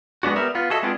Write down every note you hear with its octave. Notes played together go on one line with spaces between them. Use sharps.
G#3 B3 D4 F#4
G3 B3 A#4 E5
B3 F4
F#4 G#4 A4 D#5 E5
G#3 B3 C4 D4 F4 G#4